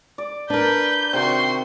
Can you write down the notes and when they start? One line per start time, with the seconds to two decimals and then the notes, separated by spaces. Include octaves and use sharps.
0.18 D5
0.50 D4 A#4 B4 G6
1.13 C3 D#3 F#4 C6 C#6